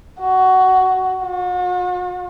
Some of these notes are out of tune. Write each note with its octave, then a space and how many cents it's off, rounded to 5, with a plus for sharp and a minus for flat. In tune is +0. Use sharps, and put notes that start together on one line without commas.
F#4 +15
F#4 -45